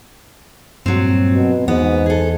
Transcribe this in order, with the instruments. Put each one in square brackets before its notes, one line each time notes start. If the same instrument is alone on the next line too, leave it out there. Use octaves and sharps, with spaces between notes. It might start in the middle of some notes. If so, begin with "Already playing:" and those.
[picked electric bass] G2 A#2 [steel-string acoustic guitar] F#3 C4
[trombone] B2
[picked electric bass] E2 [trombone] G#2 [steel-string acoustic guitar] B3
[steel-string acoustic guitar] G#4 A4